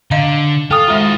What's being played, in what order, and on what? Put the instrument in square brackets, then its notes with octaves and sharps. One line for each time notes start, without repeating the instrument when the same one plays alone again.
[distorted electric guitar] D3 [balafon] D#5 F5 A#5
[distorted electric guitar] F4 [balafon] A4 [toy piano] G5 A5 D#6
[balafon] D#3 G#3 A#5 [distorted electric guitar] F4 F#4